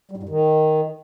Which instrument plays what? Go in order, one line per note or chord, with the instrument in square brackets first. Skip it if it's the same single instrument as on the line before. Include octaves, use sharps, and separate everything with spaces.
[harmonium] G3
G#2
G2
D#3